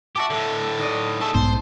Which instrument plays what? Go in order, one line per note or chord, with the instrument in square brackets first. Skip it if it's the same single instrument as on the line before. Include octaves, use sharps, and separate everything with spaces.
[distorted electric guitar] F#4 G4 [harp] E5 A5 D6
[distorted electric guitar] A2 D3
[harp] D#4 D5 D#5
[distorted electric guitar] A3 G#4 [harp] A5
[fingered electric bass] B1 G#2 B3 [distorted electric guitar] C5